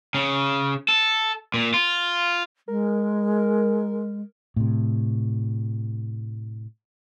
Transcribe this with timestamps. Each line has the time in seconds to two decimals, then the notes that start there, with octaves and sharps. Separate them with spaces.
0.14 C#3
0.89 A4
1.54 A#2
1.74 F4
2.68 G#3 A#4
4.56 A2 C3